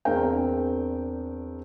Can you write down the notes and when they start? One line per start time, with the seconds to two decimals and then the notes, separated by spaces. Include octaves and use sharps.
0.05 E2 C4 D4 A#4 G5